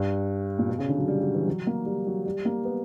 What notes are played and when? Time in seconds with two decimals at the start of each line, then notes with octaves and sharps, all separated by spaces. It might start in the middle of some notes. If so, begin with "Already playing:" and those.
Already playing: G2
0.59 A#2
0.68 B2
0.79 C#3
0.89 D3
0.98 F#3
1.08 G3
1.21 F#3
1.34 E3
1.47 F#3
1.67 A#3
1.86 G3
2.07 F#3
2.26 G3
2.45 A#3
2.65 B3